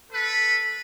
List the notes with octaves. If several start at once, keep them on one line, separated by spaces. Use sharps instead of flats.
A4 B4